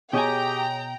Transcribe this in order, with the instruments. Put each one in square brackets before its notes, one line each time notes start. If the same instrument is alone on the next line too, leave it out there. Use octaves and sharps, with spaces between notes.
[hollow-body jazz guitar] B2 G#5 [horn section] G4 [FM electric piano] G#4 C#5 D#6 [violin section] G5 A#5